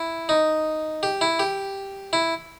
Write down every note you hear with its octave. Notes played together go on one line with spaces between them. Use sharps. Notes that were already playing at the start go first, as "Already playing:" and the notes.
Already playing: E4
D#4
G4
E4
G4
E4